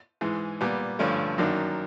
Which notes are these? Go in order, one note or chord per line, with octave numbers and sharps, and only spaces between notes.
G#2 E3 G#3
A#2 G3 B3
G2 D3 F3 A3 C#4
F#2 D#3 F#3 A#3 D4